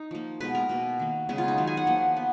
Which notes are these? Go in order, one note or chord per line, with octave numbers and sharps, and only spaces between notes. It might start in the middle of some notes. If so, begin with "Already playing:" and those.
Already playing: D#4
F3 A#3
B2 G#3 B3 B4
A#4
B2 A#3
D#3 A#3
C#3 G#3 B3 G#4
F4
D#4
D#3 F#3 B3
G#5
F#5
F3 A#3
B3